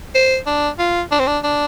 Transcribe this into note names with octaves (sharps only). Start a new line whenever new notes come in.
C5
D4
F4
D4
C4
D4
D4